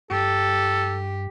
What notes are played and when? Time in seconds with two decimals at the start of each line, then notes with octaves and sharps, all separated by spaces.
0.11 G2 G4 A4